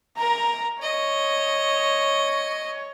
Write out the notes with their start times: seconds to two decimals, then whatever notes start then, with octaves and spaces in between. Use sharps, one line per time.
0.18 A#4 A#5
0.82 C#5 D#5